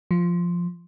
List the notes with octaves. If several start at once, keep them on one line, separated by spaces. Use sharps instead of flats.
F3